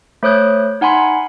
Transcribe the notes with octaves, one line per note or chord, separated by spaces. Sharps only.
A3 C5 C#5 D#6 F#6 G6
D#4 F#5 G#5 B5 C6